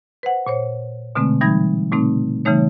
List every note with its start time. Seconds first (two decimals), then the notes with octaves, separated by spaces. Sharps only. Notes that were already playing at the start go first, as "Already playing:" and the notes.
0.23 B4 C5 F#5
0.47 A#2 C5 C#5
1.15 B2 D3 G#3 A3 C4
1.41 E3 G3 D#4 B5 G#6 A#6
1.92 A#2 C#3 A3 C4 D#4
2.45 C#3 E3 G3 A3 D#4 C#5